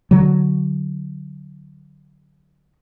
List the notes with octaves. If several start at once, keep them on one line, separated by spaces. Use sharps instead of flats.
D3 F#3